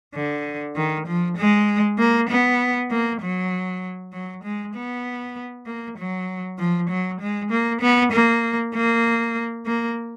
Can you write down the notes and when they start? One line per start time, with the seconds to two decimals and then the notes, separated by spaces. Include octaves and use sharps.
0.14 D3
0.76 D#3
1.07 F3
1.37 G#3
1.98 A#3
2.29 B3
2.91 A#3
3.22 F#3
4.13 F#3
4.43 G#3
4.75 B3
5.66 A#3
5.98 F#3
6.58 F3
6.89 F#3
7.21 G#3
7.51 A#3
7.81 B3
8.12 A#3
8.74 A#3
9.66 A#3